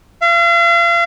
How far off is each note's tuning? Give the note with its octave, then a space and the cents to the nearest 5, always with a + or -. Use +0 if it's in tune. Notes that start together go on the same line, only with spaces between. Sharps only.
F5 -40